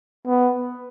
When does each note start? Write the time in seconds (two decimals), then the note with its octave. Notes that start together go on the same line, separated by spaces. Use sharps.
0.27 B3